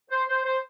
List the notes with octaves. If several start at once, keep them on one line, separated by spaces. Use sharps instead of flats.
C5
C5
C5